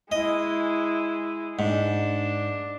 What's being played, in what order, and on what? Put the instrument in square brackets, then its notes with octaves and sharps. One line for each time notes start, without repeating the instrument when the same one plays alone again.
[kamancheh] G#3 E4 [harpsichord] D#5
[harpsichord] G#2 [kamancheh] D4